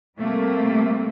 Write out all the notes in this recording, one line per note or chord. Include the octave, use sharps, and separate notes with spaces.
C3 G3 A3 A#3